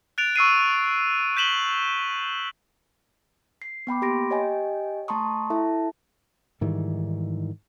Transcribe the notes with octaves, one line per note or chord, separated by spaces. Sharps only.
F#6 A6 D7 F7
C#6 E6 C7 D#7
G6 B6 E7 F#7 G7
C7
B3 G5 B5 D6
A#3 G4 B5 C6 A#6 D7
G4 C#5 D#5 G5 G#5
A3 A5 A#5 C6 C#6 D#6
E4 A4 E5 A5
G#2 D#3 E3 G3